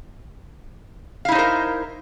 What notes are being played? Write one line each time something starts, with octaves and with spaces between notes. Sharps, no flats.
D#4 E4 A#4 C5 F5